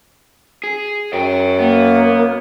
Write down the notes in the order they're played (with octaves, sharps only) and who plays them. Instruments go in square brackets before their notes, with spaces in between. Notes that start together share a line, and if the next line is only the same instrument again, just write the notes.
[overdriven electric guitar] G#4
[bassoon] F#2 [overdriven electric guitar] D#5 G5
[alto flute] A#3 [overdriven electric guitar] B3